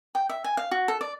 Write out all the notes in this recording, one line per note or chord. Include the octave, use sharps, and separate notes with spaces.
G5
E5
G#5
F5
F#4
A4
D5